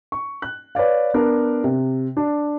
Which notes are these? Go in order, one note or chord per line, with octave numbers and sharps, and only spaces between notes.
C#6
F#6
B4 C#5 D5 F5
B3 D4 A#4
C3
D4